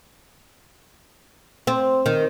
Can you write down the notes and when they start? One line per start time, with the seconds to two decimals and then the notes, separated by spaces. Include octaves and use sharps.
1.67 C4
2.06 D#3